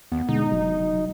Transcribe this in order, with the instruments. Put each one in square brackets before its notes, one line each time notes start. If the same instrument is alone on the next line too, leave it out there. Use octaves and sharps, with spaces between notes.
[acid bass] D#2 [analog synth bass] B3
[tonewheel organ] B2 D3 G#3 [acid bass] D#4
[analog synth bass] F1 [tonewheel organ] F#3